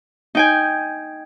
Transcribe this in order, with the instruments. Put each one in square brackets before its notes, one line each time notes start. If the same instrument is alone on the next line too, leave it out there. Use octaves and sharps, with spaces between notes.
[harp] D#4 G5 G#5